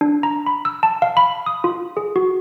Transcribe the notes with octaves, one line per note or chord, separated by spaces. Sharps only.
D4
A#5
B5
E6
A5
F5
B5
D#6
F4
G#4
F#4